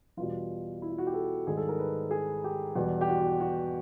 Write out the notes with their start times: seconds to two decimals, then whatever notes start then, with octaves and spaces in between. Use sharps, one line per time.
0.17 E2 B2 G3 F4
0.82 E4
0.90 F4
0.98 F#4
1.07 G4
1.14 A4
1.47 G#2 D#3 G3 G#4
1.57 A4
1.69 A#4
1.79 B4
2.11 G#4
2.44 G4
2.76 E2 B2 G3
3.01 G4
3.08 F#4
3.19 F#4
3.40 F#4